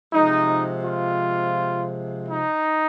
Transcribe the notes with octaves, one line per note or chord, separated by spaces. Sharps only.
C3 F3 G#3 D#4
F4
D#4